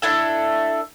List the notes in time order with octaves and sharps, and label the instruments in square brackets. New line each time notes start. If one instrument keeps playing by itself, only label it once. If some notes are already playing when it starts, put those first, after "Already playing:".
[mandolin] D4 E4 A4